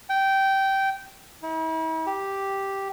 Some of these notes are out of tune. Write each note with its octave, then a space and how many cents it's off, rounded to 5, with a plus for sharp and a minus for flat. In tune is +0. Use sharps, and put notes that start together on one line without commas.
G5 -15
E4 -45
G4 +0